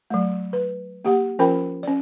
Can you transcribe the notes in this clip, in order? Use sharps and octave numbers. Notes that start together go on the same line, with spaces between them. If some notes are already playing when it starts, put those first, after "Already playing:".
F#3 A3
B4
A#3 G4 F#5
F3 C#4 F4 A#4 G5 B5
C#4 D5